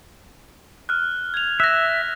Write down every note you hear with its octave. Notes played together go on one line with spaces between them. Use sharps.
F6 F#6
G#6 F7
E5 F#6 A#6